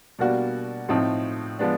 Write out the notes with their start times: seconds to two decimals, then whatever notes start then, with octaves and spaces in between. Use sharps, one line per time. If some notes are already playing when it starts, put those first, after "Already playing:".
0.19 B2 G3 A#3 D4 F#4
0.89 A2 F3 A3 C4 D#4
1.59 F3 G#3 B3 D4